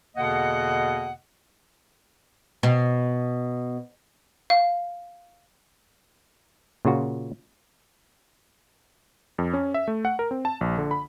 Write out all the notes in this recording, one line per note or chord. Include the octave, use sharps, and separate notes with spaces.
E2 B2 D3 A#3 D#5 F#5
B2
F5
A#2 C#3 F4 F#4
F2
C#4
E5
A3
F#5
A#4
C4
A5
A#1
D3
B5